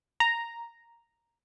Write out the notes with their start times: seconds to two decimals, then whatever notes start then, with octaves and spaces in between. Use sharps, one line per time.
0.20 A#5